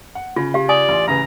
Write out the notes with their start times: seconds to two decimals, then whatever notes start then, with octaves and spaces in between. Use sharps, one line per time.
0.15 F#5
0.36 C#3 F4
0.54 G4 F5
0.69 D5 G#5 D#6
0.89 A1 C6
1.08 A1 C#3 B4 A#5